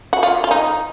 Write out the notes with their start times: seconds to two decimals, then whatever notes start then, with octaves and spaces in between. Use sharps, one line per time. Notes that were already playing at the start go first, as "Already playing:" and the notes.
0.13 F#4
0.23 F4
0.44 F4
0.51 D#4